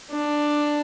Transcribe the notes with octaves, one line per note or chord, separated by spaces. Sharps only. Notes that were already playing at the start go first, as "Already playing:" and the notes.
D4